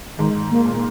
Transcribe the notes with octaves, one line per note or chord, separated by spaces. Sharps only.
G#2 D#3
A#3
A#2